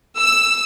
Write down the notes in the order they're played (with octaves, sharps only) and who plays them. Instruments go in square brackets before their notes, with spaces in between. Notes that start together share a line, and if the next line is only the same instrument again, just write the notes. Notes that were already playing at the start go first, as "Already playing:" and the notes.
[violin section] E6